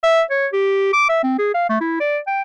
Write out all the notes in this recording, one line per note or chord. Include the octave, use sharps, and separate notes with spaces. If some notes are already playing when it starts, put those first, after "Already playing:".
E5
C#5
G4
D6
E5
C4
G#4
F5
A3
E4
D5
G5